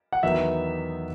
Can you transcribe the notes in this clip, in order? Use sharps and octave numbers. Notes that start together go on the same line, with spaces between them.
F#5
E2 D#3 F#3 B3 D#4 E5